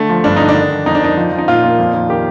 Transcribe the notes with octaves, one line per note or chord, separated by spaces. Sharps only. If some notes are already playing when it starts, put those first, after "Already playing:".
Already playing: D3 A3
F3
G2 D4
D3 D#4
D4
D#3
D#3
F2 D#4
D4
D#3 D#4
F3
F3
D#4
A#2 F4
A#2
F2
D#3
D#3 G4